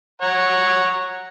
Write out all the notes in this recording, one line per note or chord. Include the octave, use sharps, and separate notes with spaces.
C#5 F#5 A#5